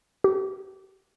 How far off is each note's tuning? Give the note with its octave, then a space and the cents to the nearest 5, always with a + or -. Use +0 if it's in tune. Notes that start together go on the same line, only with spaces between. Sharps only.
G4 -35